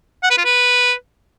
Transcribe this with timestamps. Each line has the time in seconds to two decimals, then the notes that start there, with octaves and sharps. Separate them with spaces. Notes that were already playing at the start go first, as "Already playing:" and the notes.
0.23 F#5
0.30 B4
0.38 F4
0.45 B4